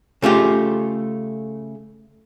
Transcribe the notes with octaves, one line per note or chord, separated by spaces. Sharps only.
C#3 A3 F4 G4